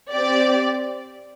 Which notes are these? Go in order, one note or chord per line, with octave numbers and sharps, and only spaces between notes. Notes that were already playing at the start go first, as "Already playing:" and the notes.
C4 G4 D5